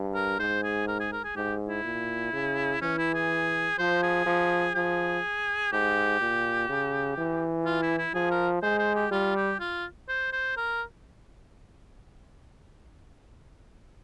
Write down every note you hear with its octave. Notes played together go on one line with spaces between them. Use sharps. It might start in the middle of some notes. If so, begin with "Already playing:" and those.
Already playing: G2
A#4
G#2 C5
G#4
A#4
G#4
A#4
G#4
G#2 G4
E4
A#2
C#3
E3 C#4
E4
G#4
F3 C5
G#4
F3
F3 G#4
G#2 G4
A#2
C#3
E3
F4
E4
E4
F3 G#4
A#4
G#3 C5
C5
G4
G3 F4
G4
F4
C5
C5
A#4